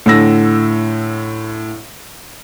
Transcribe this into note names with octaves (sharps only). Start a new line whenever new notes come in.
A2 D3 E6 A#6